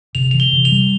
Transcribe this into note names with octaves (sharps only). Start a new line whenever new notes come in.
C3 F7
E3 F7
G7
C3
F7
G3